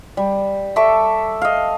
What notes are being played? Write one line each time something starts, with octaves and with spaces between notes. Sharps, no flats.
G3
A4 E5 C#6 D6
D#5 F5